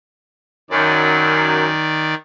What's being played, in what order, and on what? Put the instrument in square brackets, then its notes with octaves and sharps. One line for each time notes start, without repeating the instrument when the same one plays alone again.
[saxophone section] F#2 [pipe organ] D#3 D5